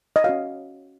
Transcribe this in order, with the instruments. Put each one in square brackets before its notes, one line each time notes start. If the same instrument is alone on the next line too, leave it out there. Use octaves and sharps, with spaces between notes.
[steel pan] D#5
C#4 F#4 C#5 F5